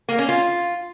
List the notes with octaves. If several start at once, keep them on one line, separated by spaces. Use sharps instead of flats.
A#3
C#4
F4